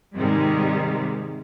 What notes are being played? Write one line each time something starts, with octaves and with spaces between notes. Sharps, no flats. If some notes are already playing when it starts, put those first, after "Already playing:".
G#2 C3 D#3 G3 G#3